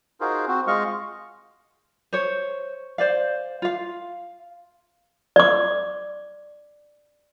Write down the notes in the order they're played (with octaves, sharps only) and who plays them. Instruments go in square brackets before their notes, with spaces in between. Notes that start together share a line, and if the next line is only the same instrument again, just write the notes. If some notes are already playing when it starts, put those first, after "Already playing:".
[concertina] D#4 F4 F#4 G#4 A#4 C5
C4 F#4
G#3 F4 D#5 F5 C#6
[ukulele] C5 C#5
C5 D5 F5
F4 F5
[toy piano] D5 D6